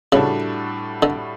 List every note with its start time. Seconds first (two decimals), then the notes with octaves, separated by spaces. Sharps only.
0.12 A2 C#3 G3 D4 F#4 A4
1.02 D3